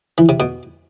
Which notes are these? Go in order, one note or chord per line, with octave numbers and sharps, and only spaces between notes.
E3
C3
B2